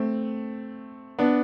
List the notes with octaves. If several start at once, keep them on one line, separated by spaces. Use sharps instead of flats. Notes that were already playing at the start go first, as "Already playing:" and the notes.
Already playing: A3 C4
B3 D4